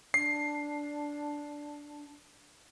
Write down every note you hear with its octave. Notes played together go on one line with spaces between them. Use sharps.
D4 C7